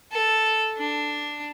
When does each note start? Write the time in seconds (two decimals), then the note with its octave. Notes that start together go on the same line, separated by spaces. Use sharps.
0.12 A4
0.78 D4